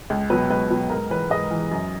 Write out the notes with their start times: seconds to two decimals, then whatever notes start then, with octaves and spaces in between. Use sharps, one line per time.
0.10 C#2
0.30 B2 F#3 B4
0.50 C#2 B4
0.70 B2 F#3
0.90 G#2 A#4
1.10 E3 B4
1.30 G#2 D#5
1.51 E3
1.71 F#2